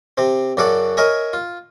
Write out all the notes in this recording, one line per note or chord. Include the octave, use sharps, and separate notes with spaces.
C3 C4
F#2 C#3 F#4 A4 D5 F#5
A#4 C#5 D#5 E5 G#5 A#5
F4